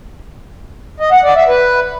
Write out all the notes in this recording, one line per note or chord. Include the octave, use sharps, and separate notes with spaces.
D#5
F#5
D5
E5
B4